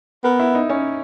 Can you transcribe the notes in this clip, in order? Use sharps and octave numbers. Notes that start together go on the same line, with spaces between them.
B3 A#4
E4
D#4
C#4